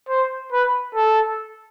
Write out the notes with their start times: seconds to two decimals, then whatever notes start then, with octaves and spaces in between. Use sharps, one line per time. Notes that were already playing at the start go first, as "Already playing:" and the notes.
0.09 C5
0.52 B4
0.95 A4